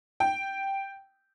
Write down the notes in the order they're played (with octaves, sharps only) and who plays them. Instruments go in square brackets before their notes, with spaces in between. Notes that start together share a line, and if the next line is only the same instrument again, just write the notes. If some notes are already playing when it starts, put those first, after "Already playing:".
[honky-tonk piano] G5